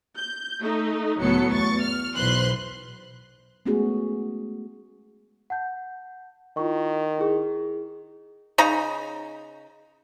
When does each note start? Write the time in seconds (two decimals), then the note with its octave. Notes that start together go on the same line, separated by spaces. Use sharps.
0.19 G6
0.61 A3 D#4
1.19 C#2 A2 F#3 B3 A4 C#7
1.52 E2 C#6 A6
1.82 F6
2.16 B1 E2 B4 C5 C6 F#6
3.66 G#3 A3 B3 C#4 F#4 G#4
5.50 F#5 A5 G6
6.57 D#3 E4 F4 C#6
7.18 E4 G#4
8.58 C#3 D#4 A#5